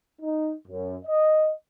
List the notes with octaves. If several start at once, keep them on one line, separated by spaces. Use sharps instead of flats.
D#4
F#2
D#5